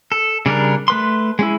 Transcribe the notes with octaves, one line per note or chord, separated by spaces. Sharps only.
A4
C#3 G3 D4 A#4
A3 B4 C6
G#3 C#4 E4